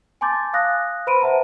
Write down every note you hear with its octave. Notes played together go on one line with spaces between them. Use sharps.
G#5 A5 C6 D6 G6 A6
F5 D#6 F#6 A#6
B4 C5 B5 C6 D7 D#7
C5 E5 F#5 A5 A#5